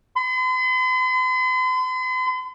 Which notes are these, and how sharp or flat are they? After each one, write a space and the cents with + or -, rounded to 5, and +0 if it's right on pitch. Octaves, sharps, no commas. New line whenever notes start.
C6 -45